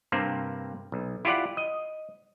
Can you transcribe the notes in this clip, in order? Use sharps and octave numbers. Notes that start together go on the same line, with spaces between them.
G2 C3 A#3 C4
B1
E4 F4 G4 D5 F#5
D#5